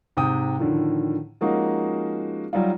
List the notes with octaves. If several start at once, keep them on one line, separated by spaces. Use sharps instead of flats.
G#2 C3 G5 D#6
A2 D3 D#3 F3
F3 G#3 A#3 C#4 D#4 F#4
F#3 G3 D#4 F4